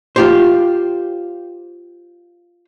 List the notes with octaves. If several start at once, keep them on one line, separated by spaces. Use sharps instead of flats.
F4 G4 C5